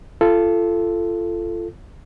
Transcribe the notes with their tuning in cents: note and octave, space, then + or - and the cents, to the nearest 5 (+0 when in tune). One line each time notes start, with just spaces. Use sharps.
F4 -25 A4 +0